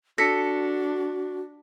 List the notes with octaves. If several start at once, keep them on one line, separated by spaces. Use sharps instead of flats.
D4 F#4 A4 A#6 B6 C#7